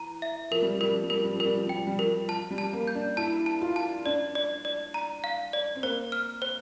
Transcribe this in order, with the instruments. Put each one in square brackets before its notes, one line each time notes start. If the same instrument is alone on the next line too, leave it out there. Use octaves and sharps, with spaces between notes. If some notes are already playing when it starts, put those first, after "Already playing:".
Already playing: [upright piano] E3 [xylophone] A#5
[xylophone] E5
[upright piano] F3 [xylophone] A#4
[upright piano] G3
F3
[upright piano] G3 [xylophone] A#4
[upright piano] F3
G3
[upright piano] F3 [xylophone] A#4
[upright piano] G3
F3
[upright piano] G3 [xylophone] A#4
[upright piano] F3
[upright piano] G3 [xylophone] G5
[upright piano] F3
G3
[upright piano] F3 [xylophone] A#4
[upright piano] F3 [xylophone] A5
[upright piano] G3
[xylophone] A5
[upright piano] A#3
[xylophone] G6
[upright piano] D4
[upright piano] E4 [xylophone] A5
[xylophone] A5
[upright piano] F4
[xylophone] A5
[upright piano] D4 [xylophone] D5
[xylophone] D5
D5
A#5
F5
D5
[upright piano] C4
[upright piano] A#3 [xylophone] C5
[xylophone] F6
C5